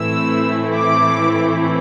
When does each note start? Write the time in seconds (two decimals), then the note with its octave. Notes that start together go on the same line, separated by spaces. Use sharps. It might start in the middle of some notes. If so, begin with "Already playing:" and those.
Already playing: A2 E3 A3 C4 E4 E6
0.75 D6